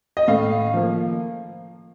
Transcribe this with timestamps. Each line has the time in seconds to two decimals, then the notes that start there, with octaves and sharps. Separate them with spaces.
0.17 D#5
0.28 A2 F5
0.74 F3 A#3